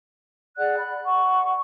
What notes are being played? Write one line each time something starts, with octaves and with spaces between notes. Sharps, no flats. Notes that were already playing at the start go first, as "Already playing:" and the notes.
G#4 D5 F#5 F#6
B5
F#5 C#6